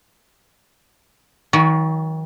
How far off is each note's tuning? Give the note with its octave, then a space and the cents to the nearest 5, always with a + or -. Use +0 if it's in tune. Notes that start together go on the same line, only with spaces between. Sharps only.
D#3 +40 F#3 -10 C#5 +35